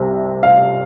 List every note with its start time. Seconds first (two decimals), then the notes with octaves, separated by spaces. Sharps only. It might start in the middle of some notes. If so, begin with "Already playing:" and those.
Already playing: C2 C3 G3
0.43 F5